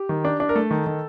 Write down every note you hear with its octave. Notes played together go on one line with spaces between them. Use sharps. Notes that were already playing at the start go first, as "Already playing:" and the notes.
Already playing: G4
D#3
D4
D4
A#4
A3 A4
D#3
D#3